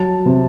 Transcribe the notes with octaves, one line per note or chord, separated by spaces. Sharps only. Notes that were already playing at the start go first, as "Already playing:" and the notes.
Already playing: F#3 A5
C3